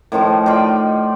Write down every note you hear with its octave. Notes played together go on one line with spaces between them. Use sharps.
A2 D#3 F3 D#4
D#4 F4 D5 G5